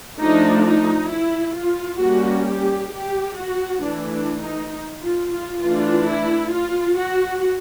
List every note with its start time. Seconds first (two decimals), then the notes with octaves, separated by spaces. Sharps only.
0.19 F3 A3 D4 D#4
0.64 D#4
1.10 E4
1.55 F4
2.00 G3 A#3 C#4 F#4
2.46 G4
2.91 G4
3.37 F#4
3.81 E3 A3 D4
4.11 D4
4.42 D#4
5.02 F4
5.32 F4
5.62 E3 A3 D4 F4
6.07 E4
6.53 F4
6.98 F#4